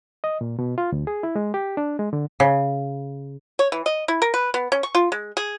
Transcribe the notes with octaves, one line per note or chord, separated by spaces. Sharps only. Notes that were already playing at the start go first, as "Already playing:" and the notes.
D#5
A#2
B2
F4
D2
G#4
E4
G#3
G4
D4
G#3
D3
C#3
C#5
E3
D#5
E4
A#4
B4
B3
C#4
C#6
F4
G#3
G#4